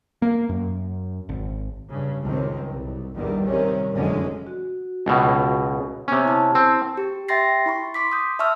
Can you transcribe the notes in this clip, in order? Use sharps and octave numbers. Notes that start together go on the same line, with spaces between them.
A#3
F#2
G#1
G2 C#3
C#2 F#2 D#3 C4
C2
A#1 E2 G2 D#3 G3
C3 D#3 G3 C#4
F1 F#2 D3 G#3 C#4
F#4
C#2 B2
C3 B3 C#4
E4 A5
C4
G4
E5 G5 C6 A6 A#6 C7
E4 B5 C#6
C6 D6 B6
D#6 G6
E5 A5 C#6 E6 F6